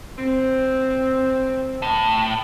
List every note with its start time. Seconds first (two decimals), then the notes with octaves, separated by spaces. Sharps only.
0.17 C4
1.82 A2